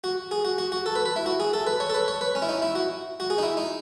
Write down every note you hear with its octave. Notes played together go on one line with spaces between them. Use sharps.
F#4
G#4
F#4
F#4
F#4
A4
B4
B4
E4
F#4
G#4
A4
B4
C#5
A4
B4
C#5
B4
C#4
E4
D#4
E4
F#4
F#4
G#4
D#4
E4
D#4